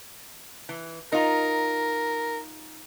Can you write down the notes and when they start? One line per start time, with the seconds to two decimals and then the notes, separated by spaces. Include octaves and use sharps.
0.69 E3
1.12 D#4 F4 A#4